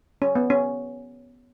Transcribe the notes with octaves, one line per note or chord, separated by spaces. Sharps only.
C#4
B3
C#4